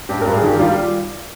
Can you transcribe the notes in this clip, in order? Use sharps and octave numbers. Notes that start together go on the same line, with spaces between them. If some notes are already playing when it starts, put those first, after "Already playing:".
G2 G4
A#4
G2
G#4
D#3 G4
G3 F4